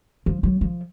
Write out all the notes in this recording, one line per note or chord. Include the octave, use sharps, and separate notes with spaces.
F3
F#3
F3